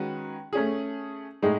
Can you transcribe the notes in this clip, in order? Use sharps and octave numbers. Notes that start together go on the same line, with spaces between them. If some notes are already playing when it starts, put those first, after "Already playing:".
Already playing: D#3 G#3 C#4 F#4 B4
A3 C#4 G#4
A2 G#3 D#4 G#4